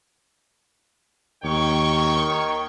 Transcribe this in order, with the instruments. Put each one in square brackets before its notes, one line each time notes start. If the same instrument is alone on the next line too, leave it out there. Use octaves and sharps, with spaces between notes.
[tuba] D#2 [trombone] D#3 [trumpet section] C#5 G5 C#6
[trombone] D#3